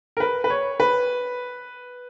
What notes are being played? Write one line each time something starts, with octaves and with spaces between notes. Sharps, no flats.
A#4
B4
B4
C#5
B4